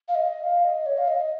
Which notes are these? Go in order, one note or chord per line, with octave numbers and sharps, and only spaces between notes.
F5
D#5
F5
D#5
C#5
F5
D#5